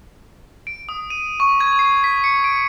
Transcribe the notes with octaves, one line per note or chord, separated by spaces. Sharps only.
D7
D#6
D#7
C#6
G#6
C7
B6
C#7
D7